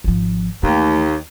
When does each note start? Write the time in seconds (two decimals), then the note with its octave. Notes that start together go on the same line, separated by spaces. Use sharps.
0.04 G#1 F3
0.63 D#2 E3 A3